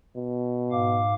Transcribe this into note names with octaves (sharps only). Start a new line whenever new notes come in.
B2
G#2 F5 D6